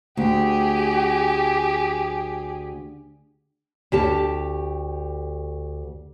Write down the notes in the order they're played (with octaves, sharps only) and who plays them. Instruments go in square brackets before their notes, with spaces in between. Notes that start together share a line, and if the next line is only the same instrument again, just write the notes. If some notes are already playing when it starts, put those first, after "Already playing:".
[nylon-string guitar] D2 [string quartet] G4 G#4
[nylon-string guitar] D2 G4 A5